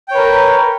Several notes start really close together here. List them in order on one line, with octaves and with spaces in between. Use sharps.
G5 C#5 B4 A#4